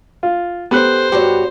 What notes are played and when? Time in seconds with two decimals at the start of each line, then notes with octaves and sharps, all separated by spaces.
0.23 F4
0.71 B3 G4 A4 C5 F#6
1.12 G2 F#4 G4 C#5